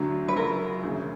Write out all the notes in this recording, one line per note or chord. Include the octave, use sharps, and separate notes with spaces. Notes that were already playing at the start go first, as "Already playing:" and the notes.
Already playing: D2 D3 F#3
B4
F#2 C#3 F#3 A#4
E1 D2 C#3